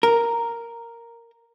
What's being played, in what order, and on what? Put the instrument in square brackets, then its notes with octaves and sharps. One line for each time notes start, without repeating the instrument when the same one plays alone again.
[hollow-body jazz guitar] A#4